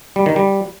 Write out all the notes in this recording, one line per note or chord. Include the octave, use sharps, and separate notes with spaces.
G3
D#3
G3